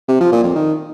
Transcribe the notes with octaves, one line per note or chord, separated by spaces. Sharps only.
C3
F3
A#2
F2
D#3